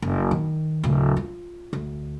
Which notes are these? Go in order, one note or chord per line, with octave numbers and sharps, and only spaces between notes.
F#1
D#3
D1 C#3
F4
D2